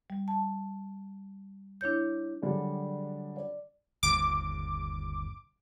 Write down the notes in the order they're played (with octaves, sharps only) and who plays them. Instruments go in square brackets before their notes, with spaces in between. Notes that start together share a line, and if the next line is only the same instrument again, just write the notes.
[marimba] G3
A5
D4 E4 C#5 G6
[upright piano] D3 F#3 G3 D4 G#4
D5
[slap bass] G1 D#2 C3 [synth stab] D6